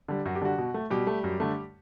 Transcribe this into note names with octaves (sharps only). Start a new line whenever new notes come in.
D3 G3
F#2 F#4
G4
D3 G3 F#4
B2
A3
B2 G3 G4
A3
F#2
D3 A3